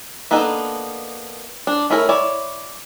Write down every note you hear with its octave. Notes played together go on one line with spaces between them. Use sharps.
A#3 B3 D4 D#4 A4
D4
A3 C#4 E4 G#4 A#4
E4 C#5 D5